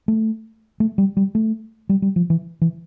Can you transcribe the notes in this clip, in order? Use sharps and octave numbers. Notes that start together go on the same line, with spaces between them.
A3
A3
G3
G3
A3
G3
G3
F3
E3
E3